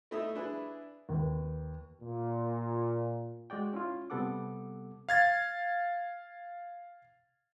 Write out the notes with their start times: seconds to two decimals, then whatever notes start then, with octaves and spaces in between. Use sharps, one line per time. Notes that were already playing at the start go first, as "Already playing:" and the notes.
0.11 A3 D#4 E4 D#5 E5
0.35 D4 E4 G#4 B4
1.09 D#2 B4
2.01 A#2
3.50 G#3 F#4 D5 G5
3.73 C#4 E4 F4
4.10 C3 G3 B3 A4 F#5 D6
5.09 F5 G#6 A6